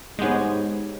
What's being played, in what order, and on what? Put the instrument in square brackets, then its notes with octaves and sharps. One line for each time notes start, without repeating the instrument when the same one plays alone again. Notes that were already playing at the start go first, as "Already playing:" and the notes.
[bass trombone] G#2 [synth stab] G#3 B3 [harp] G4 C#5